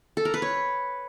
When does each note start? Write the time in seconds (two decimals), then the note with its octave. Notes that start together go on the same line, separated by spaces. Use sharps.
0.17 A4
0.25 A#4
0.34 B4
0.42 C#5